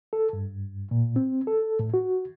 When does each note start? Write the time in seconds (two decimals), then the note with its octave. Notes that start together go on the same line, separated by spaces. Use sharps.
0.13 A4
0.33 G2
0.91 A#2
1.16 C4
1.47 A4
1.79 A2
1.94 F#4